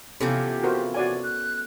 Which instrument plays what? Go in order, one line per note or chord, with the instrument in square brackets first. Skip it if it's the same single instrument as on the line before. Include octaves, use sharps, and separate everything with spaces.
[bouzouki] C3 E3 F3 [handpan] B3 C#4 A4 [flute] G4
[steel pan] F#4 A#4 C5
[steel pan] F#4 D5 G#5 [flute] C#5
[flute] F#6